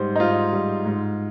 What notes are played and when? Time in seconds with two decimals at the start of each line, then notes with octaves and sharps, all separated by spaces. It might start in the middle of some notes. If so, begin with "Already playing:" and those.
Already playing: G#2 G3 C5
0.16 D#4
0.20 G#2 F4
0.53 G3
0.85 G#2